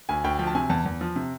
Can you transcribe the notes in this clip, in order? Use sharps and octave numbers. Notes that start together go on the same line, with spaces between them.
D2 G#5
D2 G5
F3 G5
A5
C3 G#5
E2 A5
E2
F3
C3